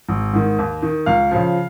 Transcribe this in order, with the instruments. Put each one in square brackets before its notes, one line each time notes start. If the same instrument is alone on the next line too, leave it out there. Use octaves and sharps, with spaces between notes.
[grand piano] G#1
G#2 D#3
D#2
D#3
C#2 F5
C#3 F3